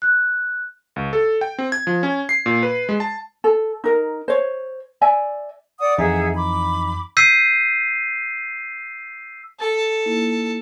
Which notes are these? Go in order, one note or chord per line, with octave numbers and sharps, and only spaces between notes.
F#6
C#2
A4
G5
C4
G#6
F3
C#4
C7
A#2
B4
G#3
A5
A4
D#4 A#4
C5 C#5
D5 E5 G#5
D5 F#5 D#6
F2 E3 D#4 G#4 E5 F#5
B5 D6
E6 G6 B6 C7 D#7
A4 A6
A#3 D#4 E4